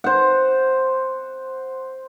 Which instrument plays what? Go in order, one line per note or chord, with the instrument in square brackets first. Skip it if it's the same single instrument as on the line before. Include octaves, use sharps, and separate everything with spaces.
[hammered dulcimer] C5 F#5